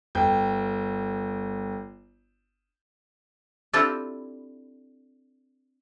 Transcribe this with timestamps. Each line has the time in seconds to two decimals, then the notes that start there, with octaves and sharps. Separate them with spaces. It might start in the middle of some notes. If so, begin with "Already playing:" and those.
0.15 G1 G5
3.73 C4 D4 E4 F4 G4 A4